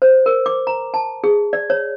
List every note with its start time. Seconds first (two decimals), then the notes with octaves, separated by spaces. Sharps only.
0.02 C5
0.26 A#4
0.46 D6
0.67 A#5
0.94 A5
1.24 G#4
1.53 D5
1.70 C#5